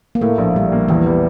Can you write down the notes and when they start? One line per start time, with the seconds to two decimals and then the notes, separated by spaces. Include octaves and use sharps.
0.15 A#3
0.21 A2 A3
0.38 A#1
0.56 A#1 G3
0.72 A#3
0.88 E2 E3
1.06 G3